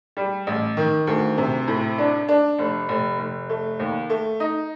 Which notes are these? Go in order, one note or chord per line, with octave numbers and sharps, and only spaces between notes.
G3
A1
D#3
D2
C3
A2
D4
D4
F1
F1
F1
A3
D#2
A3
D#4